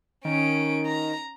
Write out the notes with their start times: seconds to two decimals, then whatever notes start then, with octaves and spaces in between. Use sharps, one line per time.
0.25 D#3 C#4 D7
0.86 A#5